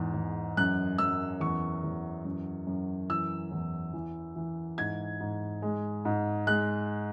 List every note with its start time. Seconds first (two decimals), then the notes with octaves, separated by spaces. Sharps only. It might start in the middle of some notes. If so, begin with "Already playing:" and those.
Already playing: E2 G#2
0.14 E2
0.57 F#2 F#6
0.98 F#2 E6
1.41 E2 C#6
1.84 E2
2.25 F#2
2.67 F#2
3.09 E3 E6
3.51 E2
3.93 E3
4.36 E3
4.78 G#2 G#6
5.21 G#2
5.62 G#3
6.05 G#2
6.47 G#3 F#6